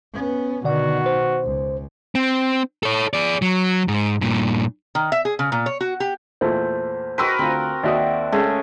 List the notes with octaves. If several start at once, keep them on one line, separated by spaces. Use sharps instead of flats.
B3 C#4
B2 D3 D#3 F#4 D5 F#5
C5
C#2
C4
A4 C#5
G#4 D5
F#3
G#2
G2 A#2
D#3
E5
G#4
C#3
A#2
C#5
F#4
G4
E2 A#2 A3 C5
F#4 A#4 B4 G5 C6 E6
D2 C4 F4
D#2 F#4 D5 E5 G5 D#6
C#3 G#3 A3